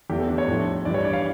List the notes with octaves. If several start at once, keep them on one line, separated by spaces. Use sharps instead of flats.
E2 E3 A3 G4
A4
D4
C#5
A2 F3 A3
G2 E3 G3 D5
C#5
D5
F5